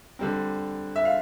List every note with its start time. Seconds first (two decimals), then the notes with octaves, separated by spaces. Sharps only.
0.19 D3 G3 C4
0.96 E5
1.05 F5